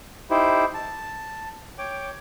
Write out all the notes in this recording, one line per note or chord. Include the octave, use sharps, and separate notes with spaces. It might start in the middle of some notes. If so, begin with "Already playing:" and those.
D#4 E4 G4 C5
A5
C#5 G5 D6